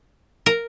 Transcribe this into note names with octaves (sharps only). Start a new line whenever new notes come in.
A#4